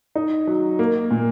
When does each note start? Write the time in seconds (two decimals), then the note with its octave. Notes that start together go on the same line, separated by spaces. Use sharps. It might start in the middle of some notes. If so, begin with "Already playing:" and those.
0.15 D#4
0.47 F#3
0.79 A#3
1.11 A#2